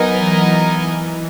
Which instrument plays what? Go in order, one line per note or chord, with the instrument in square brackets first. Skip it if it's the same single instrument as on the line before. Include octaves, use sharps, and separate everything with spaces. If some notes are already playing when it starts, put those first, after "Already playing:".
Already playing: [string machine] F#3 [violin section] B3 D#4 A#4 D#5 G#5
[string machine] E3
E3